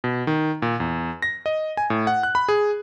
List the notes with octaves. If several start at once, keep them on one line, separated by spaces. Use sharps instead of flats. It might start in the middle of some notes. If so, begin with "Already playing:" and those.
B2
D#3
A#2
E2
A#6
D#5
G#5
A2
F#5
F#6
B5
G#4